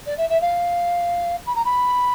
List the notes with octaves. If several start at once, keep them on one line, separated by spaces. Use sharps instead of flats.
D5
E5
E5
F5
B5
A#5
B5